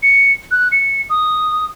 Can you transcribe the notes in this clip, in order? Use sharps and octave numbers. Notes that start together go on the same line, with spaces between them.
C#7
F#6
C#7
D#6